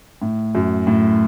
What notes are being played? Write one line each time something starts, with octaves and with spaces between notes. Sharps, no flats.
A2
F#2
A2